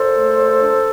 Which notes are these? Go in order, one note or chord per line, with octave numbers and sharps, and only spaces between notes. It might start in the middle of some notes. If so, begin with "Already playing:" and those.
Already playing: A#2 A4 C5
A3
A#2
D4